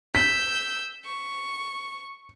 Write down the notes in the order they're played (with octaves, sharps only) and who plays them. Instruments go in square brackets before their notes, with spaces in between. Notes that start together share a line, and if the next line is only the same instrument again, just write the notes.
[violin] E6 G6 [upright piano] B6
[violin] C#6